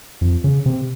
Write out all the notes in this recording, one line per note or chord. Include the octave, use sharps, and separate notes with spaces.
F2
C#3
C3